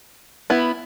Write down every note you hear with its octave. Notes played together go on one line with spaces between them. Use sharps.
B3 E4